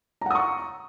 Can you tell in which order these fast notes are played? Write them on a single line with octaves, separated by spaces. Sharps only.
A#5 F#5 D#6 C#6